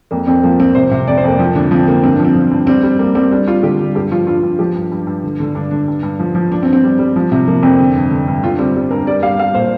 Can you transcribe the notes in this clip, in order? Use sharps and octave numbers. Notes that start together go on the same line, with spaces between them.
F2 A#3
F2 C4
F3 A#3
F3 C4
C3 C5
C3
F2 D5
C5
F2 A#3
F3 C4
D3 D4
F3 C4
D3 A#3
G2 C4
D4
F3
C4
F3
G2
G3 C4
G3
G3 A#3
G3 C4
G3 D4
G3 F4
D3 G4
G3
G2 G4
F3 F4
G2 F4
G2
F3 G4
G2
G2
G2
D3
D3
G2 D4
D3 D4
G2
G2
F3
F3
G2 D4
C4
G2
C4
G3
G3
F3
C3
F3 A#3
F2 C4
D3
G2
D3
G2
D3 F4
G3 C4
G3
G2 A#4
G3 D5
G3 F5
G3 F5
A#2 C5